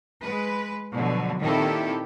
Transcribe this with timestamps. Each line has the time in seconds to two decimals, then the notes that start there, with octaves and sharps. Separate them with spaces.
0.22 G#3 B4
0.94 B2 D3 F3 F#3
1.41 A#2 D#3 C4 E4 G4 A4